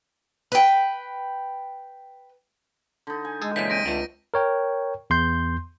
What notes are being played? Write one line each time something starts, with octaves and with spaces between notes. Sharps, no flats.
B4 G5
D3 D#4
G#5
G#3 G#4 A4
A#2 C#3 E3 G5 B6
C4 A#6 D7 D#7
C#2 D3 A3
A#4 C#5 G5
E2 C6 G6